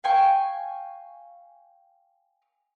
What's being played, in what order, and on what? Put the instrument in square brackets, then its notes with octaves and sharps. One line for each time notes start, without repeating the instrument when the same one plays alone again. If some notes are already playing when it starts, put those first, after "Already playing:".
[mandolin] F5 G5 G#5 C#6